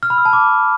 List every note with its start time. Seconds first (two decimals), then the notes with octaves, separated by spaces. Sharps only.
0.03 F6
0.10 B5
0.18 E6
0.25 A5
0.33 D6